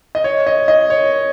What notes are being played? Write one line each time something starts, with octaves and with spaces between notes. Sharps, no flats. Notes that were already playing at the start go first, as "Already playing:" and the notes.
D#5
C#5
D#5
D#5
C#5